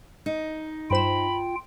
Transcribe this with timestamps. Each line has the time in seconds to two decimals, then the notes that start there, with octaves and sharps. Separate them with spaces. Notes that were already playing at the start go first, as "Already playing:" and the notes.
0.26 D#4
0.90 G2 F4 C5 G5 B5 E7